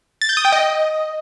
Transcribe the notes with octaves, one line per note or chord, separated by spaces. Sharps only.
A6
G6
D#6
G5
D#5